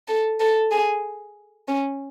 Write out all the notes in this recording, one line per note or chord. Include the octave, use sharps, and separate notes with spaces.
A4
A4
G#4
C#4